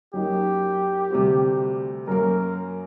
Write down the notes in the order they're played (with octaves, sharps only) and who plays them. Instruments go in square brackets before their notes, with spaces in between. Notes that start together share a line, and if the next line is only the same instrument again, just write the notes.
[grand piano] F#2 F#3 A#3 D#4 [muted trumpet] G4
[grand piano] D2 C3 G3 C4 F#4
[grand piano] F#2 F#3 A#3 [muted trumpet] A#4